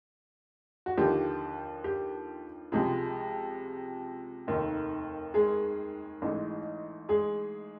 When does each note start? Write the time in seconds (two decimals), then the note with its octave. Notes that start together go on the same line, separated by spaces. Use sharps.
0.86 F#4
0.98 D#2 D3 F3 G4
1.84 G4
2.72 C#2 C3 F3 G#3 G#4
4.47 F1 D#2 D#3
5.34 G#3 G#4
6.22 A1 G#2 E3
7.09 G#3 G#4